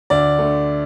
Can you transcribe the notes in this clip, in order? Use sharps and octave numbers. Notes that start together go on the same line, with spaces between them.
D2 D5
D3 A3